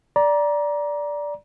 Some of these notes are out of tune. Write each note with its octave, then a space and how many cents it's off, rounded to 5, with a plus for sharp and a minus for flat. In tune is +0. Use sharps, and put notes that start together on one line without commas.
D5 -5 A#5 +25